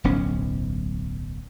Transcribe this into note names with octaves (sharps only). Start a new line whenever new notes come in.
D1 B1 C#4